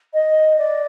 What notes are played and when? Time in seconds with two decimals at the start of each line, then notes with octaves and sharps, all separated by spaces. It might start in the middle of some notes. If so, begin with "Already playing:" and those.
0.14 D#5
0.58 D5